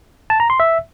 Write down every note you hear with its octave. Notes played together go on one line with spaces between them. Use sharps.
A5
A#5
C6
E5